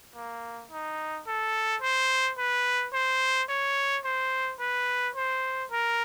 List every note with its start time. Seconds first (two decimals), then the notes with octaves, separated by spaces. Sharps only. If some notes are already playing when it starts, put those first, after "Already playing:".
0.16 A#3
0.71 D#4
1.27 A4
1.82 C5
2.38 B4
2.93 C5
3.49 C#5
4.05 C5
4.60 B4
5.15 C5
5.71 A#4